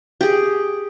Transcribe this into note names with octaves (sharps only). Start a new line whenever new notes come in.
G4 G#4